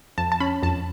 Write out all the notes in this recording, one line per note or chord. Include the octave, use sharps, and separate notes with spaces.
F2 A5
A5
C#4 B5
F2 A5